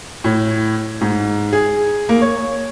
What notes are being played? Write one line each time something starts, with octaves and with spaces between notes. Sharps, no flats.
A2
G#2
G#4
A#3
C#5